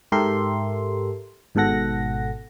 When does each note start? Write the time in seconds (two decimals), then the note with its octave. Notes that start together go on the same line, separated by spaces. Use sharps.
0.12 G#2 G4 A4 A#4 E5 C6
1.55 G#1 G#2 B2 A4 F#5 A#6